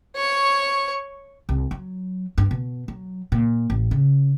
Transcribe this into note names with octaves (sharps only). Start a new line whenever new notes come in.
C#5 C#6
C2
F#3
G2
B2
F#3
A#2
A1
C#3